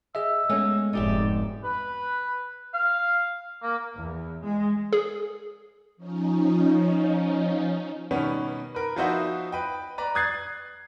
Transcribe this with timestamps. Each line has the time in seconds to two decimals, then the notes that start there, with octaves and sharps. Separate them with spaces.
0.15 G#4 D#5 E5 E6
0.50 G#3 A3 B3 C#4
0.93 F1 G#2 D#4 G4 D5 E5
1.64 B4
2.74 F5
3.63 A#3
3.97 E2
4.44 G#3
4.93 G#4
5.97 F3 C#4 D#4
8.11 B2 D#3 G3 B3 C#4
8.75 A#4 B4
8.96 F3 B3 D#4 F#4 C5 E5
9.52 B4 D#5 G5
9.98 B4 D5 A#5 B5
10.15 D#6 F#6 G#6 A6 C7